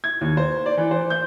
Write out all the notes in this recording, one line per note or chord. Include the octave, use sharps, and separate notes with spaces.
G#6
D#2
C5
D5
E3
C5
G6